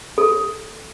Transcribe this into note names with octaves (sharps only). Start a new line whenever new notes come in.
A4